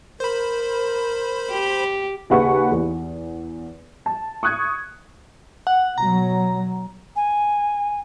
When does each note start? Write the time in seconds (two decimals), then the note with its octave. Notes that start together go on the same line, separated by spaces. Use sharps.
0.20 A#4 C5 B5
1.51 G4
2.30 D#2 C#3 B4 F#5 G#5 C#6
2.72 E2
4.06 A5
4.43 C#6 D#6 F#6 G#6
5.67 F#5
5.98 B2 F#3 A#5
7.16 G#5